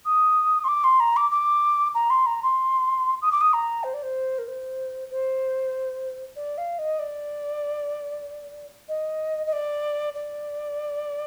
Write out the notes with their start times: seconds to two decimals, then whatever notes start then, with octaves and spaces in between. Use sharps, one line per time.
0.05 D#6
0.64 C6
0.68 D6
0.84 C6
1.00 A#5
1.16 D6
1.31 D6
1.95 A#5
2.10 C6
2.26 A#5
2.43 C6
3.22 D#6
3.32 D6
3.41 D#6
3.53 A#5
3.84 C5
3.94 D5
4.03 C5
4.38 A#4
4.48 C5
5.11 C5
6.36 D5
6.58 F5
6.79 D#5
6.99 D5
8.89 D#5
9.47 D#5
9.53 D5
10.15 D5